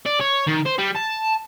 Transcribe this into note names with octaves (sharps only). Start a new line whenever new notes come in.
D5
C#5
D#3
C5
G3
A5